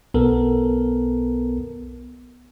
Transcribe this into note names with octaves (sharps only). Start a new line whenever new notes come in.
B1 B3 A4 A#4